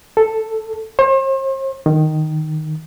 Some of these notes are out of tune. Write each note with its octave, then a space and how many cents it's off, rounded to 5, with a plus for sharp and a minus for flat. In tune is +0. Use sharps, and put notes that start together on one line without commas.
A4 +0
C5 +45
D#3 -5